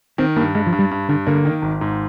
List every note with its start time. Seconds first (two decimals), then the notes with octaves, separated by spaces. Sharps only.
0.18 D#3 C4
0.36 G2 A#3
0.55 G2 G#3
0.67 F3
0.72 G2
0.79 G3
0.91 G2
1.09 G2 D3
1.27 D3 A#3
1.45 D#3
1.62 G#1
1.81 G#2